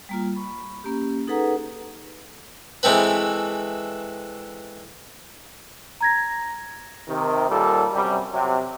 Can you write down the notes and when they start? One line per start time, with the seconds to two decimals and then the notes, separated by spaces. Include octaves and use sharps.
0.09 G3 A#3 F4
0.35 B5 C#6
0.84 A#3 C#4 G4
1.28 D#4 G#4 A4 B4 F#5 A#5
2.83 E3 G#3 A3 C4 B4
6.01 A#5 G#6 A#6
7.08 C3 D#3
7.50 D#2 A#2 G3 A4
7.94 F#2 C3 G3
8.32 C3 F#3